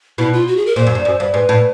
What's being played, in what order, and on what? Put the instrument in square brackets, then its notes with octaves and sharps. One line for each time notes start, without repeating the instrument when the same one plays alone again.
[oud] B2 [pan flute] E4
[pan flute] F4
F#4
G#4
A#4
[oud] A#2 [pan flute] C5
[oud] F#2
G2
F#2
G2
[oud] G#2 [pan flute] B4
[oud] A2